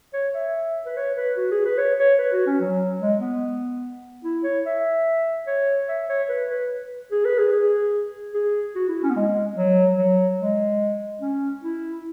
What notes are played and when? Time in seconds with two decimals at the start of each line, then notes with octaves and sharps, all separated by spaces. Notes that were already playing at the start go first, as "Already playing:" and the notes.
0.14 C#5
0.34 E5
0.86 B4
0.97 C#5
1.17 B4
1.37 F#4
1.51 G#4
1.65 B4
1.78 C#5
1.99 C#5
2.19 B4
2.33 F#4
2.47 C#4
2.61 F#3
3.01 G#3
3.21 B3
4.24 E4
4.44 C#5
4.66 E5
5.47 C#5
5.88 E5
6.09 C#5
6.29 B4
6.50 B4
7.12 G#4
7.25 B4
7.38 G#4
7.53 G#4
8.34 G#4
8.75 F#4
8.89 E4
9.03 C#4
9.10 B3
9.16 G#3
9.57 F#3
9.98 F#3
10.40 G#3
11.21 C#4
11.63 E4